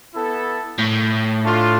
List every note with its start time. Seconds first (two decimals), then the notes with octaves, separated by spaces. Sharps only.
0.14 B3 E4 A4
0.79 A2
1.44 A3 D4 F4